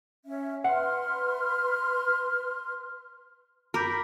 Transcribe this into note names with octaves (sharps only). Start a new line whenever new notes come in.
C#4 E5
B4 E5 F#5 C6 F6
F#2 A#4 B5 D6 G6